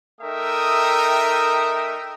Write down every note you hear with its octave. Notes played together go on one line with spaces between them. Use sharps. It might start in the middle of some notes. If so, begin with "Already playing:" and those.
A3 D#4 A#4 E5 G5 D#6